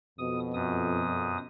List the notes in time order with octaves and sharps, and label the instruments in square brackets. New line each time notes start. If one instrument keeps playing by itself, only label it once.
[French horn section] F2 B2 [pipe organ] D#6
[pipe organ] F#2 D#6